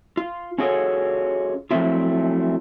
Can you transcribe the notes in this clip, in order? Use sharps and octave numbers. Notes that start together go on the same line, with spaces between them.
F4
C#4 F4 F#4 G#4 A4 C#5
F3 F#3 A3 C4 E4 F4